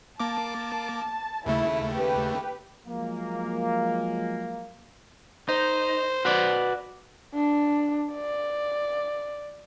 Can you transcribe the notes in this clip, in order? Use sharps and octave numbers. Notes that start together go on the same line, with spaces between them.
A#3 A5 D6
D#2 C#3 A3 E4
G4 B4
F3 F#3 G#3 A#3
D#4 C5
F#4 B4 D5
D4
D5